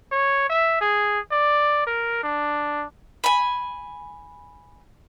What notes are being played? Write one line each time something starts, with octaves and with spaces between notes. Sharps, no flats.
C#5
E5
G#4
D5
A#4
D4
G#5 B5